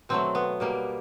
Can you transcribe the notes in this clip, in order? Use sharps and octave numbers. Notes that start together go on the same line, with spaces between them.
B2 F#3 A3 C4
B3
B2 G3 A#3